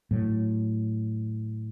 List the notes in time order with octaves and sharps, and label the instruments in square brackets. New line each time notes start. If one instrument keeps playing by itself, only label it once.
[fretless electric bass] A2 F#3